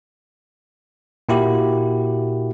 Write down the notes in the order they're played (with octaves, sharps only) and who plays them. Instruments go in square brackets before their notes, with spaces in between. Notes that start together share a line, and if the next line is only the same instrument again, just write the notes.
[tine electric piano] A#2 A#3 E4 F#4 G4